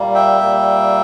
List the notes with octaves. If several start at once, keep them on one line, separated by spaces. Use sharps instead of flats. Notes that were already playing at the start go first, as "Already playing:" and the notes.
Already playing: A#2 G3 A#3
E5 G5
A#2 G3 A#3